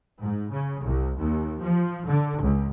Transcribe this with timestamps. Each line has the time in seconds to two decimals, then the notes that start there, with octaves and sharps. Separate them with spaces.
0.21 G#2
0.51 C#3
0.82 C2
1.16 D#2
1.60 F3
2.06 D3
2.39 C#2